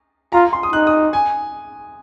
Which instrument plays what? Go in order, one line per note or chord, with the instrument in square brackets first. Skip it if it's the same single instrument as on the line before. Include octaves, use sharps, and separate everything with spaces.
[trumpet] F4 [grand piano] A#5
[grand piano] C6
D#6
[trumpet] D#4 [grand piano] F#6
[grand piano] D#6
G#5